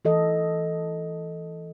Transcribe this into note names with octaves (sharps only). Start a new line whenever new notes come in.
E3 A4 D#5